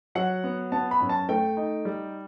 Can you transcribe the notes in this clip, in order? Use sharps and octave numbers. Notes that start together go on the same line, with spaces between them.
F#3 F#5
B3
B3 A5
B5
F#2
A5
A3 G5
D#4
G3